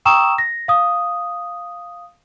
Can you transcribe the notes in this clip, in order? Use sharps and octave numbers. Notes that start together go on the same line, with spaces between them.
G5 A#5 C#6 D#6 E6 E7
A#6
F5 D#6